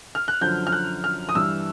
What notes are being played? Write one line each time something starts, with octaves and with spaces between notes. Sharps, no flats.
F6
F#6
F#2 D3 F3 G6
F6
F#6
F6
D#6
G2 E3 E6